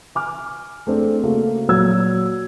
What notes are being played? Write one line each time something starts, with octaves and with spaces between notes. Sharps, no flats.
G#5 D6 F6
A3 C4 D4 G#4
C#3 A3 A#3 F#4
A#2 F#3 F#4 C#5 E6 G#6